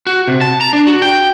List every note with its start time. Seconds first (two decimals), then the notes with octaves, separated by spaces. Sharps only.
0.07 F#4
0.28 C3
0.41 A5
0.61 A#5
0.73 D4
0.87 F#4
1.02 G5